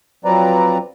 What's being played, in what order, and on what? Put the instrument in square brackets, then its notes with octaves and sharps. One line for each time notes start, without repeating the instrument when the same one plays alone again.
[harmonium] F3 F#3 C4 B4 D5 A#5